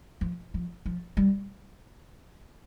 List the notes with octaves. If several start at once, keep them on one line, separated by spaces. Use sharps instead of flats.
F3
F3
F3
G3